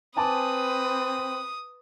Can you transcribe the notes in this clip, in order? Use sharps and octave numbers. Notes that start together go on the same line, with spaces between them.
C4 B4 G#5 A5 D6 D#6